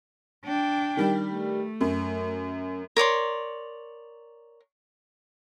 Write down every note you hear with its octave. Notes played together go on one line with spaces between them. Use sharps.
D4 G5
D#3 G3 G4
A3
F#2
A#4 C#5 D5 C6